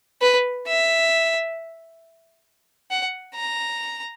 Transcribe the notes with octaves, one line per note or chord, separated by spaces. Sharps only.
B4
E5
F#5
A#5